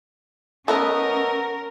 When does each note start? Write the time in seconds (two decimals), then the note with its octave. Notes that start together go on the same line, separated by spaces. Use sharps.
0.68 A3 B3 C#4 A4 A#4 D#5